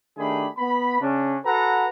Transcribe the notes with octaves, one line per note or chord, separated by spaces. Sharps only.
D#3 A3 D4 G4 G#4 B5
B3 B5
C#3 C#4 D4
F#4 A4 B4 F#5 A#5